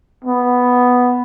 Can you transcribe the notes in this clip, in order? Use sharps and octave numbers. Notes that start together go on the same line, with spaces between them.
B3